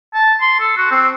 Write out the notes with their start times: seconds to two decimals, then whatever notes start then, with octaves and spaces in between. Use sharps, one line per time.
0.15 A5
0.41 C6
0.60 A4
0.77 F#4
0.91 C4